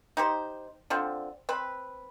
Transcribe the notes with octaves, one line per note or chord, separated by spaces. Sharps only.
D#4 G4 C5
D3 F3 C4
C4 B4